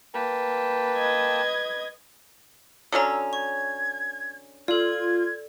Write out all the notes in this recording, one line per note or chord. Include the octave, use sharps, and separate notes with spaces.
A#3 B4 G5 A5
D#5 G#6
D3 F#3 C#4 A#5 D#6 E6
C#6 G#6
F4 A4 D5 G#6